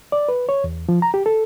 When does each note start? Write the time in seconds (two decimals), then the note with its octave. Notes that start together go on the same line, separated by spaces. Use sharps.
0.12 D5
0.29 B4
0.49 C#5
0.64 E2
0.89 F3
1.02 A#5
1.14 G4
1.26 A4